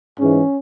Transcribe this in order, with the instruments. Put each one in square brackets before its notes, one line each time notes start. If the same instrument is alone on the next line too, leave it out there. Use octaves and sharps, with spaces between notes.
[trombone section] G#2 E3 G#3 C#4